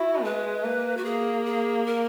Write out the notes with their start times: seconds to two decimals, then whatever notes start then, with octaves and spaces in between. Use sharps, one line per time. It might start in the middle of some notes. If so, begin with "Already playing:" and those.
Already playing: E4 F#4
0.24 G#3 B4
0.65 A#3
0.97 F#4
1.05 A#3 G#4
1.46 G#4
1.86 A#4